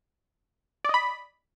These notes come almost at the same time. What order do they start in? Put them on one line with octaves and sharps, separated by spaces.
D5 D#5 B5